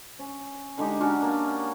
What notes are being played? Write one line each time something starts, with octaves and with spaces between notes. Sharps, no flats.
C#4
D3 G#3 D#4 G4
F#3 C#4 D4 F#4
A#3